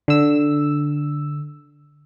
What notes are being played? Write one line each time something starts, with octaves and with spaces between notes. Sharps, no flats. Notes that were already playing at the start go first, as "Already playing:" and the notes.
D3 E6